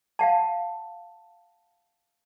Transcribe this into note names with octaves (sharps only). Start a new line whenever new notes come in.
F5 F#5 A5